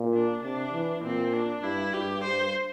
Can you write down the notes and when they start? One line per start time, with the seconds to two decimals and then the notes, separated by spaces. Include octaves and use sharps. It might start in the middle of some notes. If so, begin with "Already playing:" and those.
Already playing: A#2
0.14 D4
0.43 C3 D4
0.73 E3
1.04 A#2 C4
1.33 D4
1.63 G2 E4
1.94 G2 G4
2.24 G2 C5